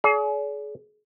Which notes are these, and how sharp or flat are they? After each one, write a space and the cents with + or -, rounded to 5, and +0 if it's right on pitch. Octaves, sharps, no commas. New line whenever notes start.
G#4 +35 D5 -40